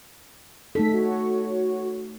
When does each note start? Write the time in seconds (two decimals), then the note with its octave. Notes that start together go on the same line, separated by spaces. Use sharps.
0.75 A3 D#4 A4 B6
0.93 F#4 C#5